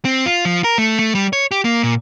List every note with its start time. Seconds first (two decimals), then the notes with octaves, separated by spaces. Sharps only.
0.05 C4
0.26 F4
0.45 F3
0.64 A#4
0.78 A3
0.99 A3
1.15 G3
1.33 C#5
1.51 G4
1.65 A#3
1.83 A#2